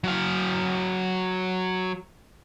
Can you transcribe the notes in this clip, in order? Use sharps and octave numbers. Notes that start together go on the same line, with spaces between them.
F#3 F5